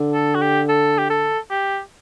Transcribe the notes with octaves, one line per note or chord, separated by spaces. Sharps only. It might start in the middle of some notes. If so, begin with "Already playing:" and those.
Already playing: D3
A4
F#4
G4
A4
G4
A4
G4